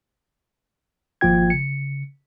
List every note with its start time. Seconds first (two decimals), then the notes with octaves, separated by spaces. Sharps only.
1.21 G#1 F3 A#3 F4 G5 G#6
1.50 C#3 C#7